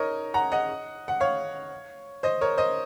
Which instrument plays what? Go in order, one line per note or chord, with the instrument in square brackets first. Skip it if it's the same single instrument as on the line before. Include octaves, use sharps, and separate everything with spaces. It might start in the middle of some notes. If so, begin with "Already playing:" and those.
Already playing: [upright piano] D#4 A#4 C#5 D#5
F#5 A#5
D#5 F#5
F#5
C#5 F5
C5 D#5
A#4 C#5
C5 D#5